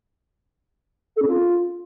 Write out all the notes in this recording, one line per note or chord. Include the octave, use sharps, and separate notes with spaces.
A4
C#4
F4